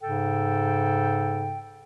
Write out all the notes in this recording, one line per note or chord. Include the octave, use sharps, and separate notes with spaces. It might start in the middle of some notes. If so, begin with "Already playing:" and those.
G#2 C#3 A4 G5